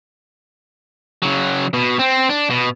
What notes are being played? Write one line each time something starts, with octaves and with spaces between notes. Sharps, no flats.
C#3 F#3
B2
C4
D4
B2